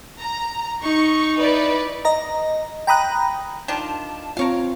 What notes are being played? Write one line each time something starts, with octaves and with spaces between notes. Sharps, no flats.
A#5
D#4 C#6
E4 B4 D5
D#5 A#5
G5 A#5 B5 D#6 F#6
D#3 D4 F4 A5
C4 F4 A#4 C#5 F5